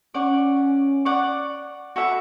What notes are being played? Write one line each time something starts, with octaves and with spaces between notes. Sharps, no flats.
C#4 D5 F#5 C#6
D5 F#5 C#6
F#4 A4 E5 B5